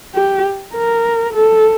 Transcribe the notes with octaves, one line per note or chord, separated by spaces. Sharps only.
G4
A#4
A4